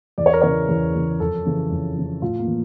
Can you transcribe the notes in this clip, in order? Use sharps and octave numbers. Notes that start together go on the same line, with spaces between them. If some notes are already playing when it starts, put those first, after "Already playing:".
E2 D5
C#5
A#4
C#3 E3 C#5
E2
C#3 E3
F2 A4
C#3 E3
F2
C#3 E3
A2 F4
A#3
E3